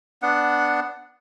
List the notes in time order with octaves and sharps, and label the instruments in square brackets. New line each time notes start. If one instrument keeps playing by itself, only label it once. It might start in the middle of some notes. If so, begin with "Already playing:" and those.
[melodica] B3 D4 F#5